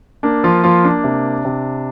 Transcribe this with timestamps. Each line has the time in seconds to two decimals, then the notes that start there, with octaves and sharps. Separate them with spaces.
0.23 A#3 D4
0.44 F3 F4
0.64 F3 A#3 F4
0.84 D4
1.04 C3
1.45 C3